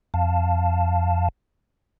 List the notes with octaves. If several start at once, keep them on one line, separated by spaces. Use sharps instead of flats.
F2 F5 A5